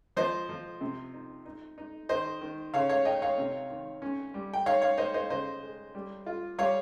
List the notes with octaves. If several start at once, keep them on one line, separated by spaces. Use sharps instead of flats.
F3 C5 D#5
F3
C3
D#4
D#4
D#4
D#3 C5 D#5
D#3
C#3 C#5 F5
C#5 F5
D#4 D#5 G5
C#5 F5
C3
D#3
C#4
G3
G5
D#4 C#5 F5
C#5 F5
D#4 C5 D#5
C5 D#5
C#3 C5 D#5
G#3
G3
F4
G3 C#5 F5